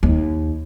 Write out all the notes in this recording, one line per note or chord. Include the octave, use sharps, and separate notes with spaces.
D#2